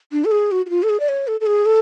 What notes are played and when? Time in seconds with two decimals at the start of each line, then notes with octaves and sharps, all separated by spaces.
0.12 D4
0.25 A4
0.31 G#4
0.51 F#4
0.66 F#4
0.70 F4
0.83 A4
0.89 G#4
1.00 D5
1.09 C#5
1.27 A4
1.40 A4
1.46 G#4
1.66 A4